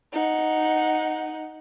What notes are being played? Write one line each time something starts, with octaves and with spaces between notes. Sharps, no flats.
D#4 F#5